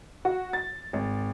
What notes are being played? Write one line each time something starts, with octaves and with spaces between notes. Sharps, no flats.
F#4
A6
G#1